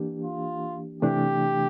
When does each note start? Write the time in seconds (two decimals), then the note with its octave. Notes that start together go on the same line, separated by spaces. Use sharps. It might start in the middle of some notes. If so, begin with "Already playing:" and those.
Already playing: E3 A#3 D4 G4
0.24 F4
1.02 C3 E3 A3 D4 G4